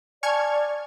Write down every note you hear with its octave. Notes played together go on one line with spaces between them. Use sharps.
D5 G#5 A5 C#6 F6 G#6